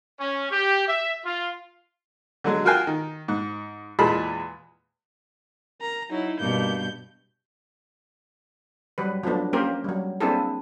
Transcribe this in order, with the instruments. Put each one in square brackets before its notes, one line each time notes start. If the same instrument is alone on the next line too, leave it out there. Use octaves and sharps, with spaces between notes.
[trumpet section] C#4
G4
E5
F4
[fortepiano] D3 F#3 G#3
F4 F#4 A#4 F5 G5 G#5
D#3
G#2
E2 A#2 G#3 G#4 A5 B5
[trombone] A#4 [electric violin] A#5
[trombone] F#3 [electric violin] D#4 E4
[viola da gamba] G2 B2 [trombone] A#3 [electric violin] G6
[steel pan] F#3 G3 B4
F3 F#3 A3 B3 D4
A#3 C#4 G4 A#4 C5
F#3 G3
A#3 C4 D4 E4 G#4 A4